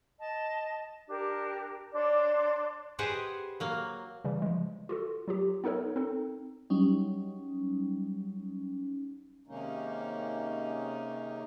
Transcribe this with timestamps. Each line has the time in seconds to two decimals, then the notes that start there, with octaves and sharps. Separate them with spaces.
0.18 D#5 A5
1.08 D4 G4 A#4
1.93 D4 C#5 D5 C6
2.99 G4 G#4 B4 C5 D#5 F#5
3.60 F#3 A#3
4.24 C#3 E3 G3
4.42 F3 G#3
4.89 F4 F#4 A4
5.28 F#3 F4 G4
5.64 B3 D#4 A4 A#4 C#5
5.96 C4 D#4 A4
6.70 F#3 G3 C#4 D#4
9.47 C3 D#3 G#3 A#3 C#4 D#4